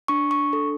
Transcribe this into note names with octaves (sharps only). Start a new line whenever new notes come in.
D4 C#6
C#6
A4